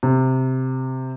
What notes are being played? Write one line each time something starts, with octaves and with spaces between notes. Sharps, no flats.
C3